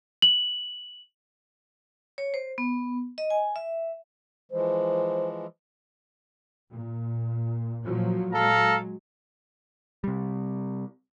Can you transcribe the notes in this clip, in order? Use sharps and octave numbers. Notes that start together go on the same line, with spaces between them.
F#7
C#5
C5
B3
D#5
G#5
E5
E3 F3 G#3 C5
A#2
A#2 F3 F#3
F#3 G#3 A4 F5 A#5
C3 G3